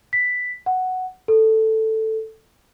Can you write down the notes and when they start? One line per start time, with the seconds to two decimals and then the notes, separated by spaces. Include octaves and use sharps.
0.13 B6
0.66 F#5
1.28 A4